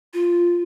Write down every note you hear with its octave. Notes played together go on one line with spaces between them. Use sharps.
F4